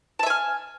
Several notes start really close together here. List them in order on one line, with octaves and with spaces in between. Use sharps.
A5 E5 G#5 F6